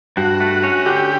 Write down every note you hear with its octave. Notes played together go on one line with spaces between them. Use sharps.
G2 F#4
A3
C#4
D3 G4